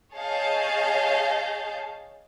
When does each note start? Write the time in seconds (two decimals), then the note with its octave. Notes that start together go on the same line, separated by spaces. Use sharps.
0.13 G#4 C#5 D#5 F5 A5 G6